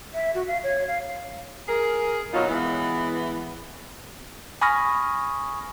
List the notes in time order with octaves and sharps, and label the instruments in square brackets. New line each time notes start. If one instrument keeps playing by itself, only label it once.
[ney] E5
F#4
F5
C#5
F5
[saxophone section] G#4 A#4
B2 F#3 D#4 F4
E3 G#3 B3
[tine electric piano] G#5 B5 C#6 D#6 F6 A#6